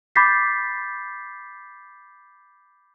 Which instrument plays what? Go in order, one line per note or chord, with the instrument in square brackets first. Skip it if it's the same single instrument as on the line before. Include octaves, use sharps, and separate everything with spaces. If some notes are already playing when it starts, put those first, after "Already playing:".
[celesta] B5 D6 G6 A6 B6 C7